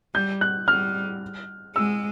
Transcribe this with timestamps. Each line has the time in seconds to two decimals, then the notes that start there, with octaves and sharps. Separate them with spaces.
0.14 G3 G6
0.41 F#6
0.68 G3 F6
1.75 G#3 E6